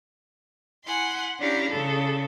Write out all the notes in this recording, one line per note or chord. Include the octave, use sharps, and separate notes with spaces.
E4 F#5 G#5 C6
C#4 D4 E4 G4 F5 A#5
C#3 A4